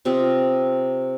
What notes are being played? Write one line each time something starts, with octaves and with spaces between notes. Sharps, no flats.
C3 C4 F4 D#5